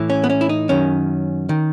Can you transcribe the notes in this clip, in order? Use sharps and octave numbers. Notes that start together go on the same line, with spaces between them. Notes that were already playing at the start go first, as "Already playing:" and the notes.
Already playing: A2 E3
C#4
B3
C#4
E4
D#4
F#2 D#3 C#4
D#3